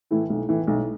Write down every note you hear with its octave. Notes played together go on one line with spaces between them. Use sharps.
A2 E3 A3 E4
B1
A2 E3
B1